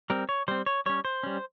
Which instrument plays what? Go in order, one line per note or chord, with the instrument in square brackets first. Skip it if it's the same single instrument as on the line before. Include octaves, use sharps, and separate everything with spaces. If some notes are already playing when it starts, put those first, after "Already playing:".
[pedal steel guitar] G3 C4 A#4
C#5
G3 C4 C5
C#5
G3 C#4 C#5
C5
G3 C#4